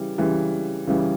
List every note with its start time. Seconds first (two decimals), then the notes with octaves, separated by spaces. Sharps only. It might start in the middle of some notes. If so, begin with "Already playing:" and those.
Already playing: C#3 E3 G3
0.18 C#3 E3 G3
0.87 C#3 E3 G3